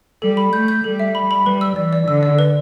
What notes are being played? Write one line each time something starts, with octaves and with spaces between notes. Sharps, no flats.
G3 A4
B5
A3 G6
G6
G3 A4
E5
B5
B5
G3 B4
E6
E3 D5
D5
D3 E6
D5
B4